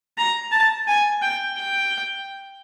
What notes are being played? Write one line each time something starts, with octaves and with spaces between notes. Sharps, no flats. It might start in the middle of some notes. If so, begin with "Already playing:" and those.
A#5
A5
G#5
G5
G5